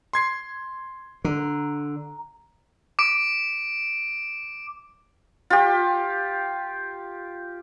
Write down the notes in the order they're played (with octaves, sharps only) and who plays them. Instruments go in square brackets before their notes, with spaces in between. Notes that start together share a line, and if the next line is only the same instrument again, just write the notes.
[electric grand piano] C6 G#6 C7
[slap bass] D3 [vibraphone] A#5
[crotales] D6 D7
[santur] F4 G4